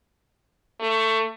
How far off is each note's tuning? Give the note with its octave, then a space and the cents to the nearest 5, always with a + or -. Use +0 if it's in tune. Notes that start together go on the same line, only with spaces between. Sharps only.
A3 +20